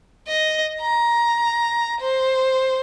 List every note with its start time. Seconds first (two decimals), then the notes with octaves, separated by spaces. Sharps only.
0.28 D#5
0.81 A#5
2.00 C5